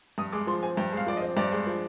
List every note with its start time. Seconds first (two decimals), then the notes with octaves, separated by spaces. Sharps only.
0.18 G2 D#6
0.33 G#3 D6
0.47 F3 C6
0.63 C4 G#5
0.77 G2 G5
0.93 G#3 F5
1.07 F3 D5
1.17 D#5
1.22 C4
1.37 G2 D5
1.52 G#3
1.67 F3